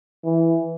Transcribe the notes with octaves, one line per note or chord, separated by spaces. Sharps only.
E3